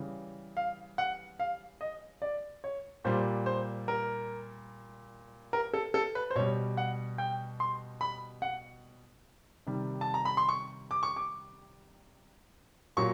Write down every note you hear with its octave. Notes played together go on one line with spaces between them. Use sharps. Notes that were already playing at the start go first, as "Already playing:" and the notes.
Already playing: C#3 E3 G3
F5
F#5
F5
D#5
D5
C#5
A#2 G3 C5
C5
A#4
A#4
A4
A4
B4
C5
B2 G3 C#5
F#5
G5
C6
B5
F#5
C3 D#3 G3
A5
A#5
B5
C6
C#6
D6
C#6
D6
A#2 F#3 C#6